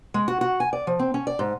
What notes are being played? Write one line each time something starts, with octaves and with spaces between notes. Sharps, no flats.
G#3
F#4
F#4
G#5
D5
F3
C4
C#4
D5
G#2